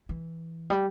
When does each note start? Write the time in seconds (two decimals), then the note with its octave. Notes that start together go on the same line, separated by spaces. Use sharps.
0.09 E3
0.70 G3